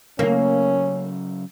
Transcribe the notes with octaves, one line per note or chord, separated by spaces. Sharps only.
C#3 F#3 A3 A#3 C#4